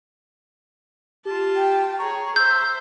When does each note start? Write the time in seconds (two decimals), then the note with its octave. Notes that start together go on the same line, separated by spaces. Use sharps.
1.25 F4 G4 A5
1.56 G5
1.99 G#4 C#5 A#5 C#6
2.36 C5 E5 E6 G6